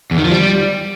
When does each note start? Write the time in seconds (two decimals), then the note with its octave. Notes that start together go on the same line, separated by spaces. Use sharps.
0.11 E2
0.18 D#3
0.25 F3
0.32 G3